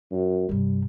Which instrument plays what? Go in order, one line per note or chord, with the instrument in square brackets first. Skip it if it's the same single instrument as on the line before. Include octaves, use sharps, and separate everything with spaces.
[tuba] F#2
[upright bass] G2 C3 [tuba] G3